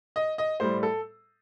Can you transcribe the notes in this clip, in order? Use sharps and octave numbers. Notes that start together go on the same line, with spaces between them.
D#5
D#5
A2 G3 C5
A4